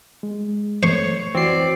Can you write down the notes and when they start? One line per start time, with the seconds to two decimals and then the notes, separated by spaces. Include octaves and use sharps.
0.23 G#3
0.83 A3 C5 C#5 C#6
1.35 E3 C4 F#4 D5 C7